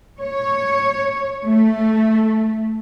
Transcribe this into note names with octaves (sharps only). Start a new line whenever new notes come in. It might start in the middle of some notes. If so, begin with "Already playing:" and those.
C#5
A3